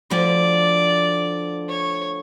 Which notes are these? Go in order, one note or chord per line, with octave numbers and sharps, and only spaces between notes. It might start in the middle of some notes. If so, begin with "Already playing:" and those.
D2 D3 F3 D5
C#5